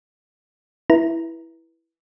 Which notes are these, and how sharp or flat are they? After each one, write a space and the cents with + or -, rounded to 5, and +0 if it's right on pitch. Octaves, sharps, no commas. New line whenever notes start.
E4 +0 B4 -20 A#5 +0